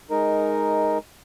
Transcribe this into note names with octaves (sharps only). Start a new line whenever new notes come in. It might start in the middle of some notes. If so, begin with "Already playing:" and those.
G#3 D#4 A#4